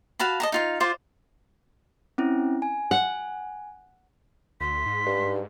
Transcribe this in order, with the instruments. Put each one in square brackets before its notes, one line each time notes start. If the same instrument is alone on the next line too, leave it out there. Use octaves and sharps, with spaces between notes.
[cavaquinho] F#4 F5 A5 B5
D#5 A5 A#5
D#4 F4 F5
F4 C5 D5
[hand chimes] C4 C#4 E4
G#5
[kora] F#5
[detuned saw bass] D2 [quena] C6 [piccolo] B6
[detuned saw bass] G#2
[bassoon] G2